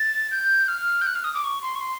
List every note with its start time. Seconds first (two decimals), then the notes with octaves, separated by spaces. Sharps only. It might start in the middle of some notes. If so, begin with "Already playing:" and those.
Already playing: A6
0.31 G6
0.68 F6
1.01 G6
1.07 F#6
1.15 F6
1.24 D#6
1.35 D6
1.44 C#6
1.63 C6
1.75 C#6
1.81 C6